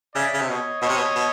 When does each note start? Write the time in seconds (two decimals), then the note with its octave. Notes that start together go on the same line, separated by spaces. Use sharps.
0.14 C#3 D5 E5
0.34 C#3
0.41 C3
0.48 B2 C#5 D#5
0.82 B2 C#5 D#5
0.89 C3
0.97 B2
1.16 B2